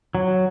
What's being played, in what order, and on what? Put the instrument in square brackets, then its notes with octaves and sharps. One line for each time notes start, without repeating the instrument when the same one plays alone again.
[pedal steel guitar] F#3